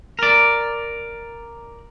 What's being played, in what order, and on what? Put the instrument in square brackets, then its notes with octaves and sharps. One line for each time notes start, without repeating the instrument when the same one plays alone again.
[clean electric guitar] A#4 D5